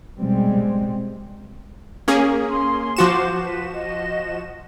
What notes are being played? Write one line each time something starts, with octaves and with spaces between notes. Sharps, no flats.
B2 G3 G#3 C4
A#3 C#4 G#4
C6
F3 F#4 C5 C6 D6 E7
B4
D#5